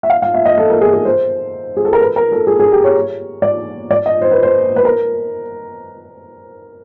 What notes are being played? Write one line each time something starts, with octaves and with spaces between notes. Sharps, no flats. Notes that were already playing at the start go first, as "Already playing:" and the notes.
E5
F5
F5
E5
D#5
A4
A#4
G#4
G#4
C5
G#4
A4
A#4
B4
A#4
A4
G#4
G#4
G4
C#5
D5
D5
D#5
C5
B4
C5
B4
A#4